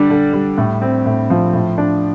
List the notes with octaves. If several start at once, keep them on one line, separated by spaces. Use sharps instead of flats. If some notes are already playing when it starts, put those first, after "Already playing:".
Already playing: D3 G3 D4
D3
G3
A2
C4
A2
F3
A2
D4